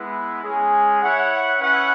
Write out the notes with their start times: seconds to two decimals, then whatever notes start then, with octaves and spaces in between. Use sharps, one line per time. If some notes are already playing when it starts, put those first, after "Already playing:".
Already playing: G#3 B3 E4
0.43 G#3 C#4 G#4
1.02 E4 C#5 F#5
1.60 C#4 E4 B4 F#5